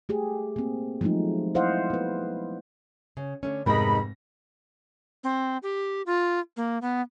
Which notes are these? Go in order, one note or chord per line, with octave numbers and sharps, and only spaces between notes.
A3 G4 G#4
A#3 C4
F3 F#3 G#3 A3 D#4
E4 C5 D#5 F5 F#5
B3 B4
C#3
D3 A3 C#4
F1 G#2 G#3 B3 D#4 A#4 B5 A#6
C4
G4
F4
A#3
B3